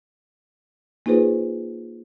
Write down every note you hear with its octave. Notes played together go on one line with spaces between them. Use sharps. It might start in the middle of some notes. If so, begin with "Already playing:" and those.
A#3 D#4 F4 G#4 B4 C5